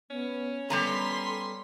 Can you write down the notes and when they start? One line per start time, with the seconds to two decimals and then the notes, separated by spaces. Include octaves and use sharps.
0.10 B3 C#4
0.70 G3 B3 A4 A#5 C6 B6